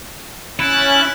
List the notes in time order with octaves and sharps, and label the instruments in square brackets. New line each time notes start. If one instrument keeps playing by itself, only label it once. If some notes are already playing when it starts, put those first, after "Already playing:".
[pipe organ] C#4 F#6 A6 [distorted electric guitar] E4